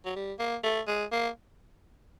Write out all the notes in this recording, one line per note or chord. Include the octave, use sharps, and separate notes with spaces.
F#3
G3
A#3
A3
G#3
A#3